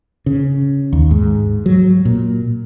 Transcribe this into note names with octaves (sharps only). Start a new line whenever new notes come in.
C#3
D#2
G#2
F#3
A#2